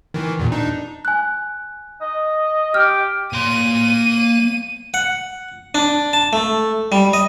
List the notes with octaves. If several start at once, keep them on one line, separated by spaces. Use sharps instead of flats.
D#3 E3
E2 A#2
D4 D#4
G#5 F#6
D#5
G4 F6
A#3 C6 D#7
F#5
D4
A5
A3
G3
D#5